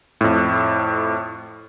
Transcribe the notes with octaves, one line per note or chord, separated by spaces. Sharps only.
F2 A2